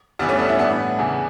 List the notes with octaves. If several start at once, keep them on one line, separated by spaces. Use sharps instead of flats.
G2 E3 G3 B3
A3 C#4
B3 D4
C#4 E4
A2 E3 B3 D4
E2 C#3 E3